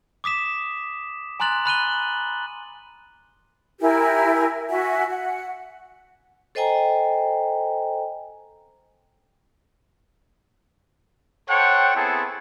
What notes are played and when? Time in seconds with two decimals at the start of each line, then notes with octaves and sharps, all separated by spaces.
0.24 D6 D#6 B6 E7
1.40 G#5 A#5 C6 F#6 A6 F#7
1.65 B5 F#6 D#7 G7
3.80 E4 G4 A#4 G#5
4.69 F#4 E5 G#5
5.08 F#5
6.55 A4 C5 D#5 G5 G#5 A#5
11.49 A4 C5 C#5 F#5 G5
11.95 B3 C4 E4 G#4 A4